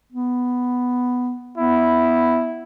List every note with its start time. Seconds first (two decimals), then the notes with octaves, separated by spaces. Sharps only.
0.12 B3
1.57 B3 E4